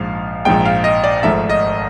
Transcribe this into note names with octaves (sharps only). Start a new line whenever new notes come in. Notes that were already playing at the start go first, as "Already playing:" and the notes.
Already playing: A#1 G#2 F3 G#3 F5
A#1 G#2 F3 G#3 G5
F5
D#5
D5
G#1 G#2 F3 A3 E5
D#5